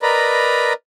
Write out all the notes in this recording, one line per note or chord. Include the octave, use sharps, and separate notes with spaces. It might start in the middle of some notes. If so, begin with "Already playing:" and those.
A#4 B4 D5 D#5 A#5 B5